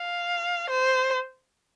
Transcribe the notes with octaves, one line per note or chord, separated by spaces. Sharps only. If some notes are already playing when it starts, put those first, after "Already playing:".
Already playing: F5
C5